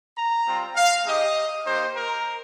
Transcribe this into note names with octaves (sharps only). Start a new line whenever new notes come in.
A#5
G3 C4 F4
F5
G#3 D#4 G4 D#5
A#3 D#4 G4 C5
A#4